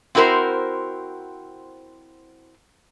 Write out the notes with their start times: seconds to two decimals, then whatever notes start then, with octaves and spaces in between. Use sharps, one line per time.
0.15 C4 E4 F#4 A#4 C5